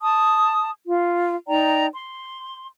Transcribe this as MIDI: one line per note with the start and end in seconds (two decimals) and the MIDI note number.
0.01 0.71 81
0.01 0.71 87
0.86 1.35 65
1.47 1.87 63
1.47 1.87 74
1.47 1.87 79
1.47 1.87 82
1.94 2.67 84